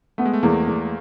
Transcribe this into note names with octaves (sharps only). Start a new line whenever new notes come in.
A3 B3
G#3
A3
E2 A#3
E2